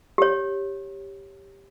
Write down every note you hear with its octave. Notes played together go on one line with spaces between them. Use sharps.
G4 C#5